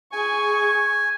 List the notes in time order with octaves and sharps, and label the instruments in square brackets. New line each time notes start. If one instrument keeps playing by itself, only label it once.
[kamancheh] G#4 C#6 [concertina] G#5